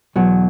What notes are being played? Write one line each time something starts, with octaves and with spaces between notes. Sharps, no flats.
E2 B2 F#3